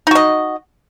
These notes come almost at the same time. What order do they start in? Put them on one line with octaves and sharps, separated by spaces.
D#4 F#4 D#5